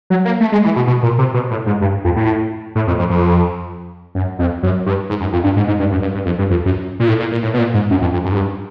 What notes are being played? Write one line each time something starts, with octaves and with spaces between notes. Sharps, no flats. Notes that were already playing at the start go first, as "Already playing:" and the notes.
F#3
A#3
A3
G#3
E3
B2
B2
A#2
C3
B2
A2
G#2
G2
F2
A2
A2
F2
F2
F2
F#2
F2
F#2
G2
G#2
F#2
F2
G2
G#2
G#2
G2
F#2
G2
G2
F2
G2
F2
F#2
A#2
A2
A#2
A#2
A2
B2
A#2
G#2
F#2
F2
F2
F#2
G#2
G2